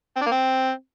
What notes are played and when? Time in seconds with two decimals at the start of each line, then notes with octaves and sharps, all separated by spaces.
0.16 C4
0.21 D4
0.26 A#3
0.31 C4